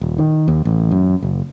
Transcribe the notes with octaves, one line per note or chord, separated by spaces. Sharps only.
D#1
D#3
D#2
A1
F#2
F#1